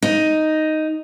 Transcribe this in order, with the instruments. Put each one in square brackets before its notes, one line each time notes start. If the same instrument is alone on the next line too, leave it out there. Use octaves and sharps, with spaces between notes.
[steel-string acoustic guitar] D#4